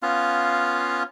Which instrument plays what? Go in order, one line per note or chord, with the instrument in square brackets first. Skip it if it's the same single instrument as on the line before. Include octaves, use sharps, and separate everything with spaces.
[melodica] B3 C#4 F4 F5